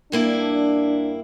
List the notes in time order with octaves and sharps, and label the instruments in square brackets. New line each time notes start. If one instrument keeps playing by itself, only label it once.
[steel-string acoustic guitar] G2 A#3 E4 [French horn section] D4